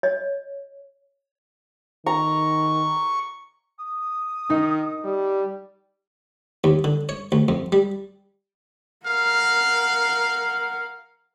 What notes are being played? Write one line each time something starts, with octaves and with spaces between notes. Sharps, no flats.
C#5 D#5
D#3 A#5 C#6
D#6
D#3 D#4
G3
D#2
D3
C#5
D2
F2
G3
A#4 F5 F#5